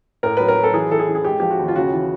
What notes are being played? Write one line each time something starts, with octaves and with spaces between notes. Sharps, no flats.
A2 A#4
F#3 B4
A#4
F#3
A4
E3 G#4
E3 A4
G#4
E3
G#4
G#3 G4
F3 G4
F#4
D#2
F4
C#3 F#4
E3